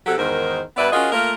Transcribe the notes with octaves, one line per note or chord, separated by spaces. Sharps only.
C3 F#3 F#4 G4 A4
E2 G#2 D#3 A#4 C5
G2 B3 B4 D5 E5
C#4 F4 F#4 G#4 A#4 D#5
A3 A#3 F4 A#4